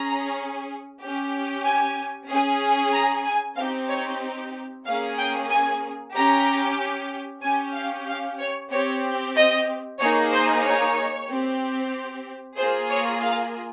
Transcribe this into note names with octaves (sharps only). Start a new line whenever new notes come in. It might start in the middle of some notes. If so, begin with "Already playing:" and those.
Already playing: C#4 G#4 A#5
C#4 G4
G#5
C#4 G#4
A#5
G#5
C4 D#4 G4 F5
C#5
A#3 C#4 G#4 F5
G5
G#5
C#4 G4 A#5
C#4 G4 G#5
F5
F5
C#5
C4 G4 C#5
D#5
A#3 D#4 G#4 C#5
C5
C#5
C4 G4
A#3 F4 G#4 C5
C#5
F5